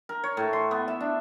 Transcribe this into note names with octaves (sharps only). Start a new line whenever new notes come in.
A#4
C#5
A2
C6
B3
E5
D4